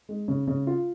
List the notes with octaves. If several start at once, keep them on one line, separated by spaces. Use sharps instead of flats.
G#3
C#3
C#3
F4